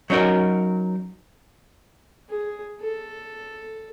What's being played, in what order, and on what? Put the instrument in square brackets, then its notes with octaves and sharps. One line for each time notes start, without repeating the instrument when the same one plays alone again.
[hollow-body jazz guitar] F#3 C#4 D#4 F#4 A#4
[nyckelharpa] G#4
A4